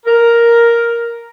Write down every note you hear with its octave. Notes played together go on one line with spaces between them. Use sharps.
A#4